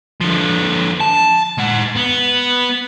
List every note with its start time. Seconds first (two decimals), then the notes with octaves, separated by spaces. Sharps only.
0.21 D3 F3
1.00 A5
1.59 G#3 F#5
1.97 B3